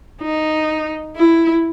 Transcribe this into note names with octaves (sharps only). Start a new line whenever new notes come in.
D#4
E4